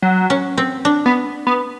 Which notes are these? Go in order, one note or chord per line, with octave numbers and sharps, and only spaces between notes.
F#3
C#4
C4
D4
B3
B3